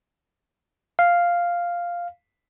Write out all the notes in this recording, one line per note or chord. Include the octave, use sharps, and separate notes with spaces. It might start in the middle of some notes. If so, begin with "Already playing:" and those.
F5